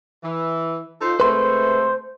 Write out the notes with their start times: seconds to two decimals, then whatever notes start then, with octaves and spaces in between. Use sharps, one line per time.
0.23 E3
1.01 D#4 F4 A4 C5
1.20 C3 G#3 A3 B4 C5 C6